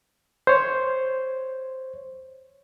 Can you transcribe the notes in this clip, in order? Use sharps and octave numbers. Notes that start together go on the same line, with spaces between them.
C5 C#5